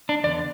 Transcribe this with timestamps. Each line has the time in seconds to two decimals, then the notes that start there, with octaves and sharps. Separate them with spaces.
0.09 D4
0.23 E2 D3 B3 D5